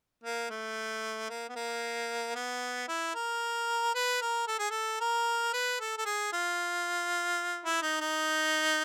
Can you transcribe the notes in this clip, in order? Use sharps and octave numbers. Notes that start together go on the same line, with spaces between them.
A#3
A3
A#3
B3
A#3
B3
E4
A#4
B4
A#4
A4
G#4
A4
A#4
B4
A4
A4
G#4
F4
E4
D#4
D#4